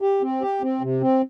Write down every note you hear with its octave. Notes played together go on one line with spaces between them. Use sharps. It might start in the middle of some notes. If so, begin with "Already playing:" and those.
G4
C4
G4
C4
C3
C4